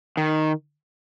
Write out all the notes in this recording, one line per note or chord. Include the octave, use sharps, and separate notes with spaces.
D#3